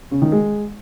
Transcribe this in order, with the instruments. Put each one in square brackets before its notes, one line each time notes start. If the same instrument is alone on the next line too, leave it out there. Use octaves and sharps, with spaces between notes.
[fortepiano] C#3
D#3
G#3